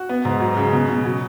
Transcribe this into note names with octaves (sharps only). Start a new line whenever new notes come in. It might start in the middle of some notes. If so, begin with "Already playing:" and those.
Already playing: F#4
B3
G#2
F#3
C#3
B2
B2
F#3